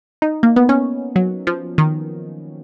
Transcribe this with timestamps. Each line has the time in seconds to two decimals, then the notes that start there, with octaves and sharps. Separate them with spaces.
0.22 D#4
0.43 A#3
0.56 B3
0.69 C#4
1.16 F#3
1.47 F3
1.78 D#3